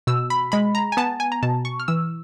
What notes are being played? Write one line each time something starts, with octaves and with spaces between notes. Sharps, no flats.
B2 E6
B5
G#3 B5
A#5
G#5
B3 A5
G#5
A#5
B2 A5
C#6
F6
E3 E6